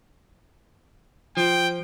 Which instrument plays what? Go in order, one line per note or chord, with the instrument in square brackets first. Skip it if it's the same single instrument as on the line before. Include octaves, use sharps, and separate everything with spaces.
[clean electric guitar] F3 [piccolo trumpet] G5